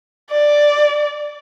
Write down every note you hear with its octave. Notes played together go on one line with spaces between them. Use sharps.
D5